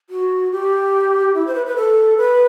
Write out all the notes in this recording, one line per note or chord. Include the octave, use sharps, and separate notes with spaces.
F#4
G4
E4
C5
B4
B4
A4
B4